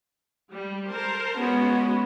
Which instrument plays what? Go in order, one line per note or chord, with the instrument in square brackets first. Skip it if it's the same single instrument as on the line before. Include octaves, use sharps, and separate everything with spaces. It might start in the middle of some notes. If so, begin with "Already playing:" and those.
[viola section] G3
A#4 C5 A5
[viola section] G#3 C#4 F#4 [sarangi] B3